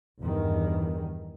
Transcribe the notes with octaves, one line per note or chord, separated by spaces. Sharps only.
E2 G2 D#3